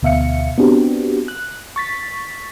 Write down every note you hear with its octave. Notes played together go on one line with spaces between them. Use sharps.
D2 B2 E5 F5 C#7
B3 C4 D4 F#4 G4
F#6
C#6 A6 B6